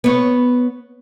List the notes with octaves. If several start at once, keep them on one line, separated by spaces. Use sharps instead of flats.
B3 C#5